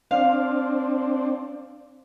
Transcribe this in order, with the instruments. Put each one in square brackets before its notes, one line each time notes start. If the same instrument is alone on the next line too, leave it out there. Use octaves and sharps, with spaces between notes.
[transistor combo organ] C4 D4 [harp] F5